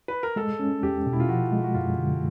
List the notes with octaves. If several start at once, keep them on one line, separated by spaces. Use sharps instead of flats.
B4
A#4
G#3 A4
C#4
E2 G4
B2
E4
F4
F3 F#4
G#3
F#4
F#2 F4
D3